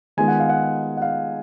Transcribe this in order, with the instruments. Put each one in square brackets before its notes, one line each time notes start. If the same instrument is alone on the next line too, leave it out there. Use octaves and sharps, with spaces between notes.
[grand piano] D#3 G#3 B3 F4 G#5
F#5
F5
F#5
F#5
F5